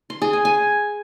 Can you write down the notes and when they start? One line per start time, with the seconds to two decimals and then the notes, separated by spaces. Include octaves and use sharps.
0.10 C6
0.22 G#4
0.33 G#5
0.45 G#5